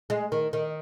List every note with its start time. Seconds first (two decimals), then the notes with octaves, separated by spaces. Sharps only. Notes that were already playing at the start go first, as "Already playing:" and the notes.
0.10 G#3
0.32 D#3
0.53 D#3